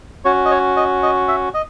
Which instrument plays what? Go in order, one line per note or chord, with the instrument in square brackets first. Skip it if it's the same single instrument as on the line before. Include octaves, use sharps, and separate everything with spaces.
[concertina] C#4 F#4 C#5
D#5
C#5
D#5
D#5
E5
D#5